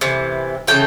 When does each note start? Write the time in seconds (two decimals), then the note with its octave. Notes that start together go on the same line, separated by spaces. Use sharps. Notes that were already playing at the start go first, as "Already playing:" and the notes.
0.01 C3 E3
0.67 C#3 E3 A3 G5